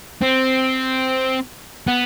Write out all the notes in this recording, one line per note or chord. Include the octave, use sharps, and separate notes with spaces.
C4
B3